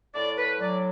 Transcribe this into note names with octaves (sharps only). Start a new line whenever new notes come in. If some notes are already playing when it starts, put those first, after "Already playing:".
A2 D5
B4
F#3 D5